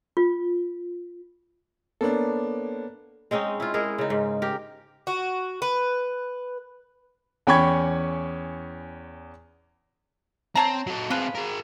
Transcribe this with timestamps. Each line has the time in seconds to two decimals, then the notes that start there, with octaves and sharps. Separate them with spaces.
0.17 F4
2.01 A#3 B3 D4 A4 C#5
3.31 G#3 C4 C#4 D#4
3.60 E4 F4
3.74 G#3 E4 G#4 A#4
3.98 C#3 D#4
4.10 G#2
4.42 G4 A#4
5.07 F#4
5.62 B4
7.47 E2 C#4 G5 B5 C#6 G#6
10.55 C4 C#5 A5 A#5
10.87 F#3 A4
11.10 F3 C4 F4 G#4 B4
11.35 G#4 A#4